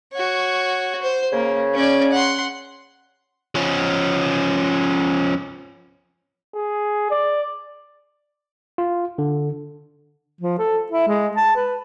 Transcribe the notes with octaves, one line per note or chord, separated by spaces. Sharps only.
F#4 C#5
C5
C#3 A#3
C#4 D5
F#5 C6
F3 C#4
G#4
D5
F4
D3
F3
A4
E4
G#3
A5
B4